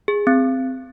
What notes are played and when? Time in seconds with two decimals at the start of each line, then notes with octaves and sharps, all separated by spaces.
0.08 G#4
0.27 C4